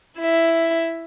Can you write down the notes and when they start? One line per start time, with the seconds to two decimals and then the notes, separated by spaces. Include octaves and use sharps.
0.19 E4 E5